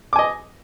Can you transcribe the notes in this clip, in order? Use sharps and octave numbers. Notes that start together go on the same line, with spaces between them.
D#5 G#5 D6